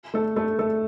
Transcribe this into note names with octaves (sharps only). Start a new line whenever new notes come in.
A3 A4
A3 A4
A3 A4